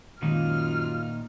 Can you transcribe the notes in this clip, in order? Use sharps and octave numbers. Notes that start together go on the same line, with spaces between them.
F#2 A#2 D#3 G#3 D#4 F4 F6